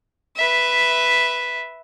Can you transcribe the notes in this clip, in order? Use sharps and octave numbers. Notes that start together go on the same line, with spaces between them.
B4 E5